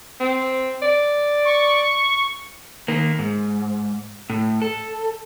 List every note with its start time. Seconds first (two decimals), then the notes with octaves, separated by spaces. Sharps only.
0.20 C4
0.82 D5
1.46 C#6
2.88 D#3 A#3
3.19 G#2
4.30 A2
4.62 A4